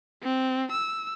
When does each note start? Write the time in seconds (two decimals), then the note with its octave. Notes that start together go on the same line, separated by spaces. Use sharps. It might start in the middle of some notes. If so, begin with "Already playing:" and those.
0.23 C4
0.72 E6